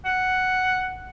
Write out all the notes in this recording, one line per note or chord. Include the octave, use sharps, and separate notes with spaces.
F#5